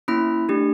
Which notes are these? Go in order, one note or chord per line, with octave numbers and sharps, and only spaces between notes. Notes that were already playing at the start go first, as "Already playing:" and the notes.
A#3 C#4 E4 B5
A3 D4 G4